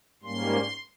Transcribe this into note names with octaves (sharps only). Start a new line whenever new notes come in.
G#2 G3 A#3 C#4 C6